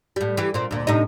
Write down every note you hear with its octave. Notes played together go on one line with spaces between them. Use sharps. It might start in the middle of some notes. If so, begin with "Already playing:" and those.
A2 G3
E3 G4
A#2 C4
D2 A#2
A2 C3 D#4